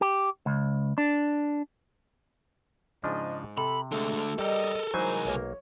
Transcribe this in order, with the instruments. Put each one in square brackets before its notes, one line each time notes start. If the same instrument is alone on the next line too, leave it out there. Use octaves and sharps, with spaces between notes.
[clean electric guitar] G4
C#2
D4
[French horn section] G#2 [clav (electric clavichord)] C#3 F3 D4 [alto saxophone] D#5
[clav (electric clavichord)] C3 [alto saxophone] A4 [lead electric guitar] B5
[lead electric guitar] D3 A3 [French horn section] G#3 [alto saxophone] A4
[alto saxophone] G3 [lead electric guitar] A4 A#4 [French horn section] D#5 [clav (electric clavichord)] G5
[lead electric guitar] C2 G#5 [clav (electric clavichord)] E3 F#3 D#4 [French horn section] G#3 A#4 [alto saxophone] C5
[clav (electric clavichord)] B1 A#3 [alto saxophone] C#5